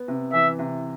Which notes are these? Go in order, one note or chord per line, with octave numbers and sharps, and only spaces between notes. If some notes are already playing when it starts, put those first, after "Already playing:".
Already playing: B3
C3
E3 E5
C3